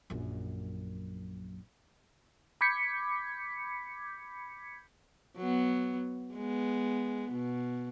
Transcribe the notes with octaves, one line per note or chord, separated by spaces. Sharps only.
A#1 F#2
B5 D6 G6 G#6 B6 C#7
F#3 B3
G#3 B3
B2